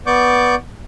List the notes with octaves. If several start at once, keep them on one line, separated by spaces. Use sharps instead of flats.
B3 D5 C#6 D6 G6